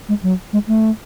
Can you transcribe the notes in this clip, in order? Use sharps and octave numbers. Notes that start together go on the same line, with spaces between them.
G#3
F#3
G#3
A3